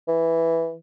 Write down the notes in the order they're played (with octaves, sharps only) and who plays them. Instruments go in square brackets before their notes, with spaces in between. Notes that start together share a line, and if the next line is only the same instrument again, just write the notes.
[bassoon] E3